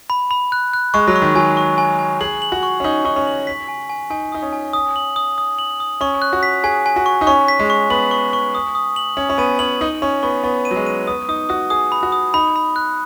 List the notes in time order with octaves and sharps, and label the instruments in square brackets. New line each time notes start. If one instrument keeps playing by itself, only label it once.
[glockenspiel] B5
B5
F#6
F#6
[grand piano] G#3 [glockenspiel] C#6
[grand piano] F#3
[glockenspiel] C#6
[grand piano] D#3
[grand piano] F#3 [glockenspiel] G#5
[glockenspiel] C#6
G#5
G#5
[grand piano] G#4 [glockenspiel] F#7
[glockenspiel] F#7
[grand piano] F#4
[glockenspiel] C#6
[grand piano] C#4
[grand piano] D#4 [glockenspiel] F#7
[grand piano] D#4 [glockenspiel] C#6
[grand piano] C#4
[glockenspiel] F#7
B6
G#5
G#5
[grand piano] D#4 [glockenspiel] G#5
[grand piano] D#4 [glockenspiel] D#6
[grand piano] C#4
[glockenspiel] G#5
D#6
F#7
D#6
D#6
F#7
D#6
[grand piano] C#4 [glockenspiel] C#6
[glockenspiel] F#6
[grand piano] F#4
[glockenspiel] B6
[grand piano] G#4 [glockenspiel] G#5
[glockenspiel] G#5
[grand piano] F#4
[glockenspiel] C#6
[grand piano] D#4
[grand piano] C#4 [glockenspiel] C#6
[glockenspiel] B6
[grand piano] G#3
[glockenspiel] C#6
[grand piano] B3 [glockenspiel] F#7
[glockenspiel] C#6
C#6
D#6
D#6
F#7
[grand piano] C#4 [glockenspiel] F#7
[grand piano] C#4
[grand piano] B3 [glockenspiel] D#7
[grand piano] C#4 [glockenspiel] F#7
[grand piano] D#4 [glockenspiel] F#7
[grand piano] C#4 [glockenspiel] C#6
[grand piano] B3 [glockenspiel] C#6
[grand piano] B3 [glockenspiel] C#6
[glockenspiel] D#7
[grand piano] F#3
G#3
[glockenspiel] D#7
[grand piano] B3 [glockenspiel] D#6
[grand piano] D#4 [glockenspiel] D#6
[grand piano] F#4 [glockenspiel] D#6
[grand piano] G#4 [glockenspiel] D#6
[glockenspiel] B5
[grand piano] F#4
[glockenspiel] D#6
[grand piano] D#4 [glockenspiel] B5
[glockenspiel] B5
F#6